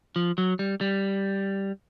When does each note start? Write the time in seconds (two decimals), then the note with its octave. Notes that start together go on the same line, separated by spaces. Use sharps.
0.16 F3
0.38 F#3
0.59 G3
0.81 G3